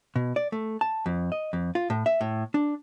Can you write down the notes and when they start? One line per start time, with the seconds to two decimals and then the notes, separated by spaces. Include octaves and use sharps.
0.16 B2
0.36 D5
0.52 A3
0.81 A5
1.06 F2
1.32 D#5
1.53 F2
1.75 F4
1.90 A2
2.06 E5
2.21 A2
2.54 D4